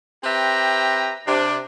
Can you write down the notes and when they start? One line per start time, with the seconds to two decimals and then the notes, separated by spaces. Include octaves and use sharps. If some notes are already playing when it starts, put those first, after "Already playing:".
0.24 C4 G4 B4 E5 G5 A#5
1.27 C3 D4